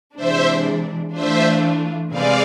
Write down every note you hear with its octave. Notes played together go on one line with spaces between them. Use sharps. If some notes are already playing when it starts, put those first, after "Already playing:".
C3 E3 G#3 D4 C5 E5
E3 A3 D4 F4 C5 E5
C3 G#3 C4 G#4 B4 D5 F5